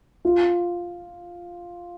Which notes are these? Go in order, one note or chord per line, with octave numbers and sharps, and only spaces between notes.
F4